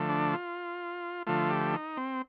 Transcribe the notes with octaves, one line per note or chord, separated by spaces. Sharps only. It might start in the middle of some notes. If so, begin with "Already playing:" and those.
Already playing: D3 F3 A3
D4
F4
D3 F3 A3 F4
G4
D#4
C4